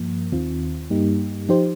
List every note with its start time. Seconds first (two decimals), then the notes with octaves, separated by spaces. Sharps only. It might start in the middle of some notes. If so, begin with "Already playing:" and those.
Already playing: G2 F3 A#3
0.32 D#2 D#3 C4 F4
0.90 G2 G3 A#3 D#4 G4
1.49 F3 D#4 G4 C5